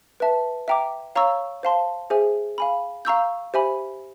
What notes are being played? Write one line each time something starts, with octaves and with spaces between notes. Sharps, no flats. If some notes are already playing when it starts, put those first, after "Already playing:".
B4 E5 A5
E5 G5 A#5 D6
C#5 F5 A#5 C#6 E6
C5 F5 A5 C6
G#4 C5 E5 G#5
F5 G#5 B5
F5 A#5 C#6 E6 G6
G4 C5 E5 G#5 B5